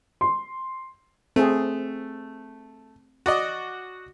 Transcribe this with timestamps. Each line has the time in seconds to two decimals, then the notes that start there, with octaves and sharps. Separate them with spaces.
0.21 C6
1.36 A3 C4 G#4
3.26 F#4 D5 D#5